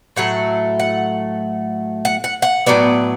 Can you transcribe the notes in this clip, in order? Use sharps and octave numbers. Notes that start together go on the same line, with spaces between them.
A2 F#3 A3 F#5
F#5
F#5
F#5
F#5
A2 F#3 B3 D5